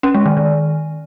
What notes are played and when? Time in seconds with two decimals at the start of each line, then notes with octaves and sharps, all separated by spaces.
0.03 C#4
0.14 G#3
0.26 D#3
0.37 D#3